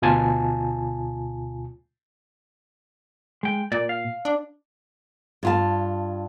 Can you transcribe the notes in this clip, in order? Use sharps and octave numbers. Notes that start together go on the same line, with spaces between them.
D2 B2 F4 G#5 A5
G#3 G5
A#2 D5
F5
D4
G2 F4 A5